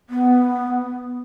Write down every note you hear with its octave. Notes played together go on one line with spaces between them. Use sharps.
B3